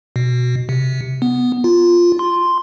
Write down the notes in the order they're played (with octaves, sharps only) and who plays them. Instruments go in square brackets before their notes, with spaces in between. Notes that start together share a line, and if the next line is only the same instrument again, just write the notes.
[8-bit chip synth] B2
C3
B3
F4
C6